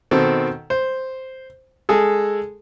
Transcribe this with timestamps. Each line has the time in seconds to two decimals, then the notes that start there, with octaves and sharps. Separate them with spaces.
0.11 B2 D#3 C4 A4
0.70 C5
1.89 G#3 G#4 A4